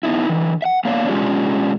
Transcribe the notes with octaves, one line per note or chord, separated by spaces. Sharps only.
B3 D#4 E4
D3 E3
E5 F#5
A#3 B3 D4 C#5 F5
B2 G#3 C#4 D4 F4 G4